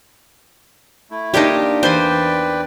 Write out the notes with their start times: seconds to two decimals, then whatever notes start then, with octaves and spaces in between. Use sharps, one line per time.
1.11 A3 E4
1.34 A#3 D4 D#4 F4 G4
1.83 E2 G4 B4 C5 D5 G5 G#5